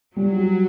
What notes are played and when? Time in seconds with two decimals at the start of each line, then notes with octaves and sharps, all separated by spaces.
0.16 F#3 G3
0.37 F#4